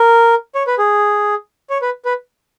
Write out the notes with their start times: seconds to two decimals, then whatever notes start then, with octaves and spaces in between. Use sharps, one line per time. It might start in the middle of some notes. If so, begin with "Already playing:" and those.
Already playing: A#4
0.55 C#5
0.67 B4
0.78 G#4
1.70 C#5
1.82 B4
2.05 B4